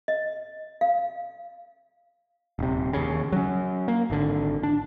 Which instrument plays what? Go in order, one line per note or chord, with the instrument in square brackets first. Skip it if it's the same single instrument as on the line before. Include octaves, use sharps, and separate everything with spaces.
[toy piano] D#5
F5
[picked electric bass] D#1 C3
D#2 C#3
F#3 C#4
A#3
G#1 D3
D4